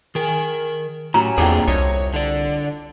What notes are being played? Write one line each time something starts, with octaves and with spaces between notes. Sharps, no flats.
D#3 G#4 A#4
A2 F#3 C#4 G4 A#5
E2 A#3 C4 D4 F4 G#4 A4 G5
C2 C#5 D#5
D3 D5